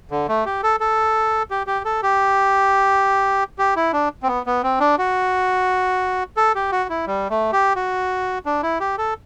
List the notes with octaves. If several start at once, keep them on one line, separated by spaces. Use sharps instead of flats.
D3
A3
G4
A4
A4
G4
G4
A4
G4
G4
E4
D4
C4
B3
B3
C4
D4
F#4
A4
G4
F#4
E4
G3
A3
G4
F#4
D4
E4
G4
A4